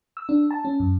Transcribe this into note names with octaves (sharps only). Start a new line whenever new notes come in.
E6
D4
A5
C#4
F#2